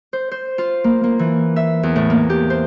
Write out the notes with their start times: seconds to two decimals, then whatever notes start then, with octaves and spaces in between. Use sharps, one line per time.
0.13 C5
0.31 C5
0.58 F4
0.84 A#3
1.04 A#3
1.19 E3
1.56 E5
1.83 E2
1.96 A2
2.10 A#3
2.30 G4
2.50 C5